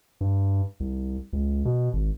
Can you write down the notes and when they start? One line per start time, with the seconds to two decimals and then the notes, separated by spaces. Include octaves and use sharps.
0.21 G2
0.80 C2
1.33 C#2
1.65 B2
1.93 G#1